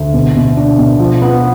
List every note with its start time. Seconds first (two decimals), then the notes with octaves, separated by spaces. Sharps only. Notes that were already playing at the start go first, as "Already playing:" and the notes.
Already playing: D2
0.14 B2
0.36 B2
0.57 D4
0.78 B2
0.99 F3
1.22 B3